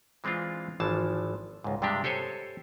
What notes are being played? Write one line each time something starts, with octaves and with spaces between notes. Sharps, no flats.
E3 G#3 C4 D4 F4
G#1 E3 F3 A5
C#2 G#2
G2 C3 G#3 D4 G4
G4 A4 C5 C#5 G#5